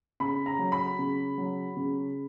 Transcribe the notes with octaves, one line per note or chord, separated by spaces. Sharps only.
C#3 B5
A#5
F#3
B5
C#3
F#3
C#3